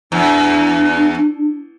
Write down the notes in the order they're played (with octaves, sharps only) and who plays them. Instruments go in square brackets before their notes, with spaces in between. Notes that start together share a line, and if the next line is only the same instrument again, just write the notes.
[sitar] E2 [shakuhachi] D4